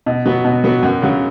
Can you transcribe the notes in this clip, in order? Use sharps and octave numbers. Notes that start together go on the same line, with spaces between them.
B2
F#3 B3 F#4
B2
F#3 B3 F#4
F#2
C#3 F#3